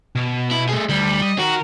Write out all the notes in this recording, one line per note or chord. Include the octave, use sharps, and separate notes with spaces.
B2
E4
A3 G#4
D2 G3
D#5
D#3 F#4 A#4